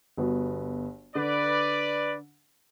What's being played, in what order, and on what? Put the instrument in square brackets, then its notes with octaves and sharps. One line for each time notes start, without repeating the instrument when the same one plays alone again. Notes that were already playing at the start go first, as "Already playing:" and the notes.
[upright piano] G1 B3 F#4
[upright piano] D3 [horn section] B4 D5